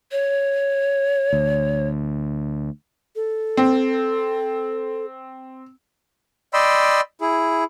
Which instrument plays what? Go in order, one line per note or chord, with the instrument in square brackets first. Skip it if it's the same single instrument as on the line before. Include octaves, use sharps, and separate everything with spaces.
[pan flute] C#5
[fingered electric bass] D2
[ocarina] A4
[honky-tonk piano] C4
[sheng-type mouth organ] D5 D#5 G5 B5 C6 E6
E4 G#4